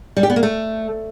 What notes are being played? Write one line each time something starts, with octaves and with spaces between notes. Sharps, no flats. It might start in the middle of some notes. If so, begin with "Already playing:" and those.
G3
G4
B3
A#3
A3